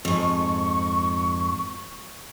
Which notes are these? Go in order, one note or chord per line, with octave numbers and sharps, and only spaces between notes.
F2 G#2 C#6